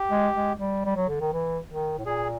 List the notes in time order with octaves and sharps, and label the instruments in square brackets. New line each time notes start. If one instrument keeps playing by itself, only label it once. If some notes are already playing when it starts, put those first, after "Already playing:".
Already playing: [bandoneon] G4
[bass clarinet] G#3
G#3
G3
G3
F#3
D3
D#3
E3
D#3
A2
[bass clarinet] A#2 [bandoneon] G#4